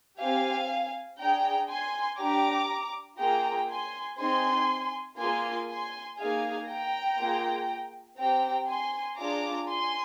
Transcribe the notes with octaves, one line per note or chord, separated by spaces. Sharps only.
C4 G4 F5 G#5
D4 G#4 G5 A#5
G#5 C6
D4 G4 A#5 D6
A#3 F4 G#4 G5 A#5
G#5 C6
C4 D#4 G#4 G#5 C6
A#3 F4 G#4 G#5 C6
G#5 C6
A#3 D#4 G#4 F5 G#5
G5 A#5
A#3 F4 G#4
C4 G4 G5 A#5
G#5 C6
D4 F4 G#4 A#5 D6
G#5 C6